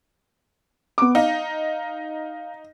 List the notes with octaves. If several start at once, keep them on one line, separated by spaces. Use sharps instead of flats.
B3 D6
D#4 F5